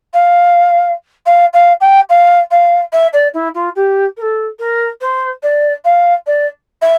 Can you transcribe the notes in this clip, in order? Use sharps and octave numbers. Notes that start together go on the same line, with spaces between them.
F5
F5
F5
G5
F5
F5
E5
D5
E4
F4
G4
A#4
A4
A#4
C5
D5
F5
D5
E5